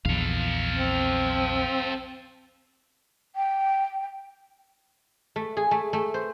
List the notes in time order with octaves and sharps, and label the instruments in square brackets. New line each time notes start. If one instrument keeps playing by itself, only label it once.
[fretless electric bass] A#1 E2 [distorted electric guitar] A4 F5
[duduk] C4
[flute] G5
[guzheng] A3
G#4
A3
A3
C5